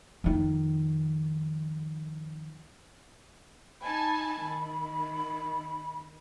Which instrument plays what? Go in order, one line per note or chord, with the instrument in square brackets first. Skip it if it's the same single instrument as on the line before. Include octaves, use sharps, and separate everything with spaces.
[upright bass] F2 D#3
[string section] D#4 G#5 A5 [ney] B5
[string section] D#3